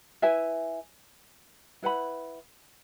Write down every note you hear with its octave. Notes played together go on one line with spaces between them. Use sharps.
E4 B4 E5 G#5
E4 B4 F#5 B5